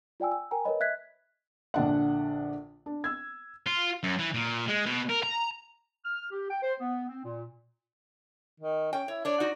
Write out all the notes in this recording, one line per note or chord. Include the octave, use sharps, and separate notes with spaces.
F4 D5 G5 G#5 E6
E6
A#4 G5 G#5 A#5
A#4 B4 C#5 D#5 B5
D#5 E5 F#6 G#6 B6
A#1 D3 D4 F#5
D4
E6 G#6
F4
F#2
E3
A#2
G#3
B2
A#4
A#5
F6
G4
G5
C5
B3
C4
A#2
D#3
C#4 G5
E4 C#5
D4 C#5 D5
D#4 F#4